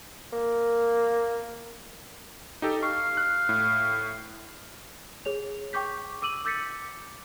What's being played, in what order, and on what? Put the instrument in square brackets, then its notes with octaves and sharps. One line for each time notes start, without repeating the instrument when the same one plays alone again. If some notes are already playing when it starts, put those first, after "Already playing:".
[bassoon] A#3
[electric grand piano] D#4 G4 A4
[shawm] F5 [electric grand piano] C#6
[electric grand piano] F#6
A2
[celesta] G#4 C#5 F7
G5 C#6 D6 G6 B6
D6 E6 D#7 F#7
D6 E6 G6 A6 B6 C#7